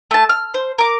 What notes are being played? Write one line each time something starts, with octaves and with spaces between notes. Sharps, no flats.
A3 A5
F6
C5
A#4 D6